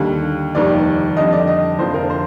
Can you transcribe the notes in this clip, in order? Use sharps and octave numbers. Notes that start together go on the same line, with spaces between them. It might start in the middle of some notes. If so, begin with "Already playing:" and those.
Already playing: D#2 D3 G3
F1 D#2 D#3 G3 D5
F2 D3 G3 D#5
D5
D#5
F1 F2 D3 F3 C5
A#4
C5